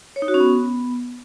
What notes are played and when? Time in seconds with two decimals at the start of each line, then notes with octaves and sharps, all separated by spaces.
0.16 C#5
0.22 D#4
0.28 F#4
0.34 C#4
0.40 B3